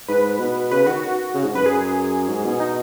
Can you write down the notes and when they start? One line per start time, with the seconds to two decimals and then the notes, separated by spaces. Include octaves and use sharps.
0.08 G#2 B4
0.39 B2
0.71 C#3 B4
0.87 D#3 F#4
1.03 F#4
1.34 C#3
1.45 G#2
1.55 F#2 B4
1.66 G#4
2.29 G#2
2.45 B2
2.60 D#4